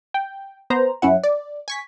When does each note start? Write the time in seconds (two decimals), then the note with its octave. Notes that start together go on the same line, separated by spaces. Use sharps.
0.14 G5
0.70 B3 C5 A#5
1.02 F#2 C#4 E4 F#5
1.23 D5
1.68 G#5 C#6 B6